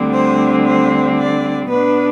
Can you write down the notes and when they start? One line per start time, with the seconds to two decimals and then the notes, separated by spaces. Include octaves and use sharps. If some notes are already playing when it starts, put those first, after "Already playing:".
Already playing: D2 D3 G3 C4
0.12 C5
0.64 C5
1.17 D5
1.69 B2 B3 D4 B4